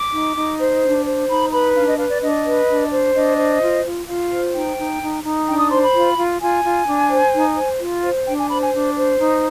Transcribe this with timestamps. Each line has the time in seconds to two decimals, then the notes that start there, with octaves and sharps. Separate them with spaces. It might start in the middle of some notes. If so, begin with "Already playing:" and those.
Already playing: D6
0.13 D#4
0.36 D#4
0.59 C5
0.83 D4
1.05 C5
1.29 D#4 B5
1.52 B4 B5
1.75 D4 F5
1.87 D#5
1.99 B4 F5
2.10 D5
2.22 D4 D#5
2.46 B4
2.69 D4
2.91 C5
3.15 D4 D#5
3.38 C5
3.61 F4
3.85 F4
4.07 F4 F5
4.31 C5
4.54 D#4 G5
4.78 D#4
5.01 D#4
5.24 D#4
5.47 D4 G5
5.59 D#6
5.70 C5 C6
5.82 B5
5.94 F4
6.17 F4
6.40 F4 G#5
6.64 F4
6.86 D4
7.10 C5
7.33 D#4
7.57 C5
7.80 F4
8.03 C5
8.26 D4 G5
8.37 G#5
8.49 C5 B5
8.61 G#5
8.73 D4
8.95 C5
9.19 D#4